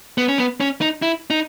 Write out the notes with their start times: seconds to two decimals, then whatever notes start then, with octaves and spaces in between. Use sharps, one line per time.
0.18 B3
0.28 C#4
0.38 B3
0.60 C#4
0.81 D#4
1.02 E4
1.30 D#4